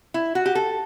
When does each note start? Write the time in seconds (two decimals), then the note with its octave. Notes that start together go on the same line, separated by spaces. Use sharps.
0.14 E4
0.35 F#4
0.46 G4
0.55 A4